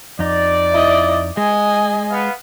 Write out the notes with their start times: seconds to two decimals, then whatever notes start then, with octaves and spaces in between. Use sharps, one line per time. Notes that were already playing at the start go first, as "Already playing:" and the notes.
0.19 F2 D#4 D5
0.73 E4 D#5
1.37 G#3 D#5 G#5
2.11 B3 F5